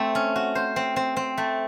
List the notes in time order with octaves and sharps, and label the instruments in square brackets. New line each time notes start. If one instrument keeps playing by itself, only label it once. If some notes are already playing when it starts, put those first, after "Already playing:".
Already playing: [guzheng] A3 C4
C#4
F#4
C5
C4
C4
C4
A3